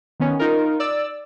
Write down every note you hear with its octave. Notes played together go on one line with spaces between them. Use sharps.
D#3 B3 C#4
D#4 F4 A#4
D5 E6